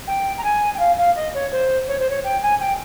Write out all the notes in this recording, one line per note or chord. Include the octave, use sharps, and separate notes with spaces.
G5
A#5
G#5
G5
F5
F5
D#5
C#5
C5
C#5
C5
C#5
G5
G#5
G5